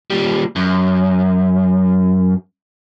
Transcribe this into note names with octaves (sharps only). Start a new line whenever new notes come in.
A#2 G3
F#2